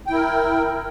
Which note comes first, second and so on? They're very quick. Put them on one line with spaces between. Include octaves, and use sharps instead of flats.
G5 E4 A#4